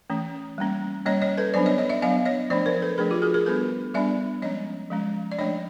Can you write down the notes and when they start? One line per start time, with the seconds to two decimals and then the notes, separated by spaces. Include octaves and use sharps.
0.10 E3 A3 C#4
0.58 G3 A#3 C#4
1.06 G3 A#3 C#4 C#5 D#5
1.22 C#5 D#5
1.38 A4 B4
1.54 F#3 B3 D4 C5 D5
1.66 C#5 D#5
1.78 C#5 D#5
1.89 D5 E5
2.02 F#3 B3 D4 D#5 F5
2.26 C#5 D#5
2.50 F3 A3 D4 C5 D5
2.66 A#4 C5
2.82 A4 B4
2.98 F3 A3 D4 G#4 A#4
3.10 F4 G4
3.22 F#4 G#4
3.34 G#4 A#4
3.46 G3 B3 D4 A4 B4
3.94 G3 B3 D4 D5 E5
4.42 F3 G#3 C#4 C#5 D#5
4.91 F3 G#3 C#4
5.32 D5
5.38 F3 A3 D4 C#5 D#5